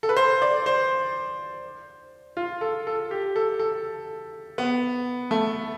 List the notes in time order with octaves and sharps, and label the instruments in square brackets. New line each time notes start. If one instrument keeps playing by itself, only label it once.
[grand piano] A4
B4
C5
D5
C5
F4
A4
A4
G4
A4
A4
B3
A3